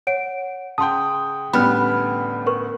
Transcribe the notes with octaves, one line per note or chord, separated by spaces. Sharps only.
C#5 F#5 D7
C#3 F#5 G5 A5 C6 D#6
A1 D2 G3 B3 B5 F6
A#4 B4 C#6